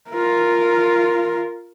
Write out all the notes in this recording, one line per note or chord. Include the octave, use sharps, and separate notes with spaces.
F4 A#4